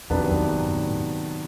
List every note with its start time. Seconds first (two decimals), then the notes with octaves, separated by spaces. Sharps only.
0.10 F2 C3 D#3 F#3 B3 D4
0.31 F2
0.54 G2
0.75 A2